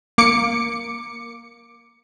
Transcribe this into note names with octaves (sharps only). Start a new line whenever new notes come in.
A#3 D6 C#7